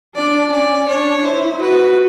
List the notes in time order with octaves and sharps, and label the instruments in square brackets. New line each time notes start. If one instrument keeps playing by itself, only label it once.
[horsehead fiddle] D4 [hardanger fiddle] D5
[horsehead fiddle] C#4 [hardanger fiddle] D5
[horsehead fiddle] D4 [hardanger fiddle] C#5
[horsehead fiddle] E4 [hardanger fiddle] C5
[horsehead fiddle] F#4 [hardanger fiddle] B4